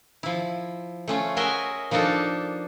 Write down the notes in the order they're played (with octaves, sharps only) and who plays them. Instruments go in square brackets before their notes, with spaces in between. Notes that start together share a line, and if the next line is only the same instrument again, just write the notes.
[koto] F3 E4
A3 C#4 F4
F#4 G#4 A#4 D#5 E5 G#5
F3 A#3 D4 D#4 A4